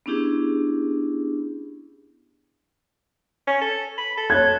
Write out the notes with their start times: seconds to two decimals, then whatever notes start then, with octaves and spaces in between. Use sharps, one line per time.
0.06 B3 C#4 D4 E4 G4 G#4
3.47 C#4
3.61 A4
3.98 B5
4.17 A4
4.30 C#5 F#6 G#6